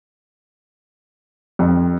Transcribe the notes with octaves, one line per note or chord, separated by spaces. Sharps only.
F2